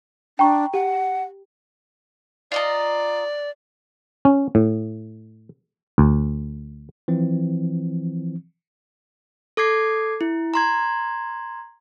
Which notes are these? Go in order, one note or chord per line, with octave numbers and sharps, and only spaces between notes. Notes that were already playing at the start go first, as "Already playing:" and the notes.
D4 G5 A#5 C#6
G4 F#5
F4 D5 D#5 A#5
C#4
A2
D2
E3 F3 C4
A4 D6 G#6 C7
E4
A#5 C6 G#6